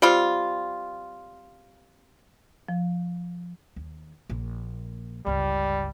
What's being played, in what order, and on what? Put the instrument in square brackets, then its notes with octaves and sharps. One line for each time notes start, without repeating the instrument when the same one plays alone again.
[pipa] G3 C4 F4
[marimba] F3
[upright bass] D#2
A#1 A#3
[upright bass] G1 C#2 [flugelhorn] G3